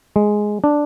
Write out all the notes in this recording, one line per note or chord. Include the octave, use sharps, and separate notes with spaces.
G#3
D4